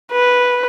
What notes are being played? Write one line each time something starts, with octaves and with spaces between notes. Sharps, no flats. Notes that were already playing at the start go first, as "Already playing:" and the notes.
B4